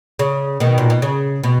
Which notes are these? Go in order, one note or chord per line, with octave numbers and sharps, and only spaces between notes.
C#3
B2 D#3
A#2
B2
C#3
B2